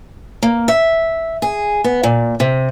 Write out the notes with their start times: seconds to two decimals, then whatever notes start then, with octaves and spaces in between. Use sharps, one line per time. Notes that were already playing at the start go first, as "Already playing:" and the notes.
0.43 A#3
0.68 E5
1.42 G#4
1.84 B3
2.03 A#2
2.40 C3